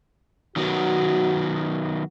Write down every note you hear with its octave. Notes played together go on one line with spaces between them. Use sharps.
D#3 F#3 B3 F#4